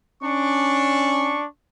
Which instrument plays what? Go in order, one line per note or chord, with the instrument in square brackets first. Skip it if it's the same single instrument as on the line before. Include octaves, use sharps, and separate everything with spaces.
[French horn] C#4 [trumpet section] D4 C#6